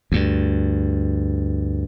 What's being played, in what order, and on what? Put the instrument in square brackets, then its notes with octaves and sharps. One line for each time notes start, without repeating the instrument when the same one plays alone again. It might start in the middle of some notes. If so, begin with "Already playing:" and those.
[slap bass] D2 G2